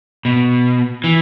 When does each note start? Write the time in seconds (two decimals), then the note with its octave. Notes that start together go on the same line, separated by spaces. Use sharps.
0.25 B2
1.04 E3